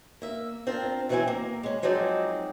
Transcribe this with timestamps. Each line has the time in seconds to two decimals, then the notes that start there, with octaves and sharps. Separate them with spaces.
0.22 A#3 E5
0.67 C4 D4 F4 A#4
1.09 B2 E3 F#3 C4 E4 G#5
1.27 A#3 A#4
1.63 G#3 C#4
1.82 F3 F#3 G#3 C4 D#4 D5